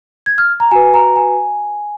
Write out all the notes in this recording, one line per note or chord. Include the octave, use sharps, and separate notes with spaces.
G#6
F6
A#5
F#4 B4 G#5
A#5
G#5